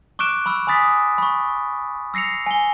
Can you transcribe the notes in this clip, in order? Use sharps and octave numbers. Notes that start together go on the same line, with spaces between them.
C#6 D6 F6 F#6 D7 E7
B5 C#6 E6 F6
G#5 B5 D#6 A6 B6
B5 C#6
E6 A#6 C7 C#7 F7
G#5 G7